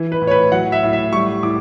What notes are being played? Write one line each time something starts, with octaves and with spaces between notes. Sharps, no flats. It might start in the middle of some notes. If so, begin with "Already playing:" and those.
Already playing: E3
B4
A2
C#5
B4
F#3 F#5
E5
A2
E5
G3 C#6
A2 D6